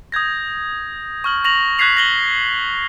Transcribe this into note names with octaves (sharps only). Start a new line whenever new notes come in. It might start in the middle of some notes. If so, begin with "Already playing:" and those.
D#6 G6 G#6 A#6
C#6 F6 F#7
C#6 A#6 F7 F#7
C#6 F#6 G#6 B6 C7 F7
A#6 F#7 G7